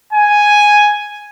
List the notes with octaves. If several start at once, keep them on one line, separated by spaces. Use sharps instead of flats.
G#5